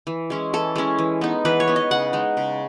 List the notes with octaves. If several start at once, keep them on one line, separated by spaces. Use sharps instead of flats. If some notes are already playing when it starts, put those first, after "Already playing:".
E3
G#3 C#4 E4
E3 A4
G#3 C#4 E4
E3
B3 D#4
E3 B4
C#5
B3 D#4
D#5
C#3 F#5
G#3 D#4
C#3